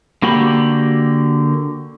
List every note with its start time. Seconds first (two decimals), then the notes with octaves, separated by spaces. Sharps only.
0.22 D3 A#3 F#4 G4 B5